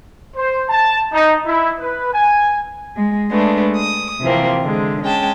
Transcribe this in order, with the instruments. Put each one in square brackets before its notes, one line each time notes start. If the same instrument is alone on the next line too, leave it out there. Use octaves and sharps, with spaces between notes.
[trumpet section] C5
A5
D#4
E4
B4
G#5
[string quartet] G#3
G#3 A3 B3 D4
D#6
C3 E3 F3 A#3 C4
D3 G#3
G#3 C#4 G5 A5